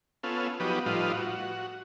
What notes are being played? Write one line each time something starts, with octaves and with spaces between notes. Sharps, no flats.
B3 C#4 F4 A4
F3 F#3 B3 D#4 G4 B4
A2 F3 G3 D#4 F4 B4
F#4